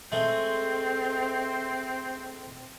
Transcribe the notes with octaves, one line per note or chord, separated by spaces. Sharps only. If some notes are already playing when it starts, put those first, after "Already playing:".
G#3 A3 C4 G#4 C5